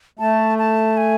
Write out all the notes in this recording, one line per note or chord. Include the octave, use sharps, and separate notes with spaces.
A3 A5
A5
G#5